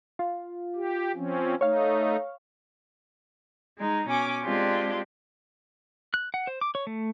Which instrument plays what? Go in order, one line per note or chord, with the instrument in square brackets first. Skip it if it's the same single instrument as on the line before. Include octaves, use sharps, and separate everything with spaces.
[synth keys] F4
[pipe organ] G4
F3 C4 C#4
[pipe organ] A3 D#4 [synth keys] C#5 F5
[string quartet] G#3 D#4
B2 C#4 G#5 D6
G#3 C4 D4 F4 G4
[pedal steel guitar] F#6
F#5
C5
D6
C#5
A3